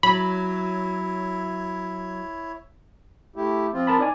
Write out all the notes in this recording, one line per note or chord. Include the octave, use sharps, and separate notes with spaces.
F#3 E4 C#5 B5
A3 E4 G4
F3 C4 F4
A#4 A5 B5
D#4 D5 G#5